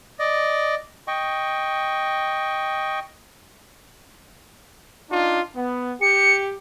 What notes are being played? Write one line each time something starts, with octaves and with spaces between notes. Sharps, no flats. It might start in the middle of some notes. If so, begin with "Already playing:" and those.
D5 D#5
D#5 G5 C#6
D4 D#4 F4
B3
G4 C#7